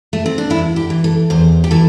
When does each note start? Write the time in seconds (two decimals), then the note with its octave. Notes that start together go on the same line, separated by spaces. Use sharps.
0.13 A3
0.26 C4
0.38 D4
0.50 E2 E4
0.76 G4
0.90 E3
1.04 A4
1.30 E2 C5
1.64 G4
1.71 E3 A4